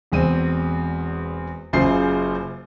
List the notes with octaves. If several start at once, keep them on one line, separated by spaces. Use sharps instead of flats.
E1 E2 C4 D#7
F#1 F#2 C#3 F4 C5 C7